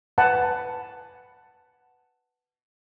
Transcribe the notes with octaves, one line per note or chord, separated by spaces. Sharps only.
B4 F#5 G#5 A5 B5